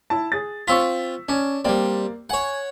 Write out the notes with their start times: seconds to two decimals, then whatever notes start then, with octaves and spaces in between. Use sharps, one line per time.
0.10 E4 A5
0.32 G#4 A6
0.68 C4 F4 C#6 E6 B6
1.29 C#4 D4
1.65 G3 A#3 C4 D5
2.30 C#5 F#5 G#5